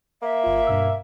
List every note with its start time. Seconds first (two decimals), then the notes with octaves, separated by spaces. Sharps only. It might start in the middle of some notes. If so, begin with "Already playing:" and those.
0.22 A#3 E5
0.44 G1 F4
0.67 G2 B2 E6